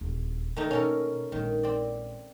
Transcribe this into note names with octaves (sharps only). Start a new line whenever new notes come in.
D#1 E2
D#3 A3 B3 D#4
B2 C#4 A4 A#4
A#1 D#3 G#3
C4 D5